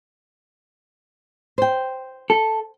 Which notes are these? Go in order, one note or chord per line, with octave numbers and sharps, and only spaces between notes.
C5 G5
A4